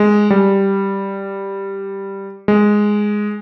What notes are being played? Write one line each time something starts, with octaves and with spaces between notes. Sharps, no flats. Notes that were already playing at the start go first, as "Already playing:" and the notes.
Already playing: G#3
G3
G#3